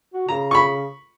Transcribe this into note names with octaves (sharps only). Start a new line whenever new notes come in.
F#4
C#3 A#5
B5 C#6